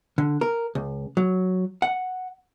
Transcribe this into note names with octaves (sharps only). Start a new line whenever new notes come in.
D3
A#4
C#2
F#3
F#5